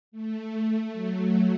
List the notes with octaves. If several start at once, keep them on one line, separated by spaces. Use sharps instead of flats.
A3
F#3